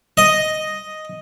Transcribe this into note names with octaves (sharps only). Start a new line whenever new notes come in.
D#5